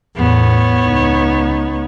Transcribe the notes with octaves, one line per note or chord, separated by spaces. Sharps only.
E2 A2 B3 C#5
C#2 D#4